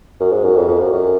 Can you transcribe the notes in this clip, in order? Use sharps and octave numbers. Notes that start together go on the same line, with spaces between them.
F#2
G#2
F#2
F2
F2
F#2
F#2